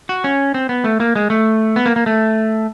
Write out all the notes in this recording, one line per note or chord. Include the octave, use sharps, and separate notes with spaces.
F#4
C#4
C4
B3
A3
A#3
G#3
A3
B3
A#3
A#3
A3